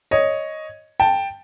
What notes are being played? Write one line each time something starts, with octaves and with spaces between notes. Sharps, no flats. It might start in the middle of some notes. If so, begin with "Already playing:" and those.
C#5 D#5
G5 A5